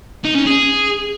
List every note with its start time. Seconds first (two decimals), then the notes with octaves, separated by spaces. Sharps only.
0.24 D#4
0.35 C#4
0.46 G#4